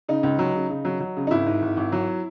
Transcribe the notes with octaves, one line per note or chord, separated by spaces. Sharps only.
C#3 D#4
C#2
F#3
C#3
C#3
F#3
F#3
C#3
D#4
G#1 E4
G#2
G#1
G#1
F#3